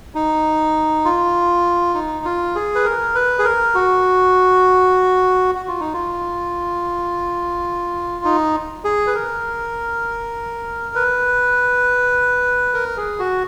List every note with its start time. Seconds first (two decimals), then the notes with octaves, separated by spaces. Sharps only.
0.15 D#4
1.05 F4
1.95 D#4
2.25 F4
2.55 G#4
2.75 B4
2.85 A#4
3.15 B4
3.39 G#4
3.44 A#4
3.75 F#4
5.55 F#4
5.68 F4
5.80 D#4
5.94 F4
8.24 D#4
8.84 G#4
9.07 B4
9.15 A#4
10.95 B4
12.74 A#4
12.97 G#4
13.19 F#4